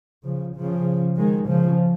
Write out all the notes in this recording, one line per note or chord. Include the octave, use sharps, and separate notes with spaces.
C#3 F3
C#3 F3
D#3 G#3
C#3 F3